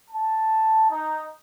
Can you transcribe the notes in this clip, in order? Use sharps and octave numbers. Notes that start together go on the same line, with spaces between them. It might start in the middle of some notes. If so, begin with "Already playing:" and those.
A5
D#4